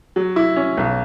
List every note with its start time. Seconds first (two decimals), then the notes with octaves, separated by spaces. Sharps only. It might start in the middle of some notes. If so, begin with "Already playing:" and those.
0.16 F#3
0.36 E4
0.56 C#4
0.78 B1